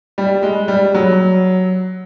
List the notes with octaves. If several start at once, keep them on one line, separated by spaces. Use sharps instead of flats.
G3
G#3
G3
F#3